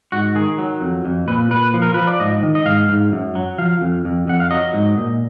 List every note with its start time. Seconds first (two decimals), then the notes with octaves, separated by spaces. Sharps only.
0.12 G#2 F#4
0.35 D#3 G#4
0.58 F#3
0.81 F2
1.05 F2
1.28 A#2 B4
1.51 A#2 B4
1.74 F3
1.82 A#4
1.94 F3 B4
2.07 D5
2.20 G#2 D#5
2.43 D#3
2.55 D#5
2.66 G#2 F5
2.89 G#2
3.12 F#2
3.35 F#3
3.58 F3 F5
3.81 F2
4.05 F2
4.27 F2 F#5
4.40 F5
4.51 F#3 D#5
4.74 G#2
4.97 A#2